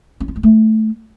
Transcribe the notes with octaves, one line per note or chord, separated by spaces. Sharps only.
C#4
F4
G#3
A3